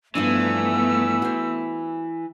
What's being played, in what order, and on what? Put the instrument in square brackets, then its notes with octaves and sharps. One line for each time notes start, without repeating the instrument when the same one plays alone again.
[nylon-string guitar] G2 F3 D4 [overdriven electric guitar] E3 [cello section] A3 B3 [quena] E6
[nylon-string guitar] F#4 C5